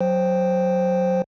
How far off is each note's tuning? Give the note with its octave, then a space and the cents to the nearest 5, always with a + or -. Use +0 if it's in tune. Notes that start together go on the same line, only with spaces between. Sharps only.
F#3 +0 C5 +0 G5 +0